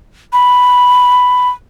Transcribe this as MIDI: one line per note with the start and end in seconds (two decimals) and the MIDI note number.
0.33 1.49 83